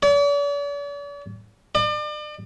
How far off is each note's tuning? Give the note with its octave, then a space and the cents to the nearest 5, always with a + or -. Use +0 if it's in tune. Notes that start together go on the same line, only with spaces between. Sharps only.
D5 -45
D5 +40